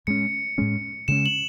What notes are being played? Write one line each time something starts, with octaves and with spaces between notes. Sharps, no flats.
A2 G#3 C#4 C#7
A2 G#3 C#4
C#3 G#3 C#4 E7
F#7